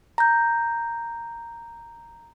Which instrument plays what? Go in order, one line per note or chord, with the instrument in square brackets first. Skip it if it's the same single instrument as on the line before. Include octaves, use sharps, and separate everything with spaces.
[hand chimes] A#5 G6